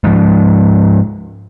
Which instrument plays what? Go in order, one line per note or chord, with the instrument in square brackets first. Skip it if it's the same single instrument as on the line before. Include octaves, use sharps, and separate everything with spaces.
[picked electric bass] G#2 F3